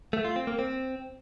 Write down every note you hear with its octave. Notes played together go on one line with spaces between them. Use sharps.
A3
F4
C4
A#3
C4